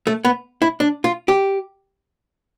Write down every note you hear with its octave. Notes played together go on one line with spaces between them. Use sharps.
A3
B3
E4
D4
F4
G4